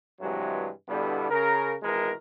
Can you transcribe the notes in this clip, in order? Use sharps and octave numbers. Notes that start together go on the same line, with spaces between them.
G2 C3 E3 F#3 G#3
G2 B2 D3 G3 B3 E4
C#3 A#4
G#1 B2 E3 G#3 A#4